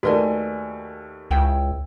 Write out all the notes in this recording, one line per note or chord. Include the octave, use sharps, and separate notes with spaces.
D#2 A3 F#4 A#4 B4 D5 D#5 G#5
C#2 E4 G5